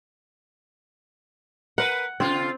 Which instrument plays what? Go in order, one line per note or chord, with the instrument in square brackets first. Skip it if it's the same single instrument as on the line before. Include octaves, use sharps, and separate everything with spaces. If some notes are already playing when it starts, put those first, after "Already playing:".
[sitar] A#4 B4 [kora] F#5
[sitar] C#3 F4 [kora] C4